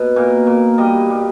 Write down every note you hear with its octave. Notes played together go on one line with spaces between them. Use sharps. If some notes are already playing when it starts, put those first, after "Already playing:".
Already playing: B2
A#2
A#2
G3 D#5
G3